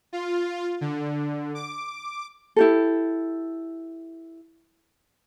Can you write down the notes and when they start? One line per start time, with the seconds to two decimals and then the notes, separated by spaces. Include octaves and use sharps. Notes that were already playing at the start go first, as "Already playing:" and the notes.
0.13 F4
0.81 D3
1.55 D6
2.56 E4 G4 A4